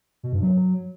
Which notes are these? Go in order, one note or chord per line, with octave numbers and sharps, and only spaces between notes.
B2
G2
F#3